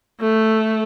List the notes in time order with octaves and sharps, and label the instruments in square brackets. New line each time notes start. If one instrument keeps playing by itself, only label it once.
[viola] A3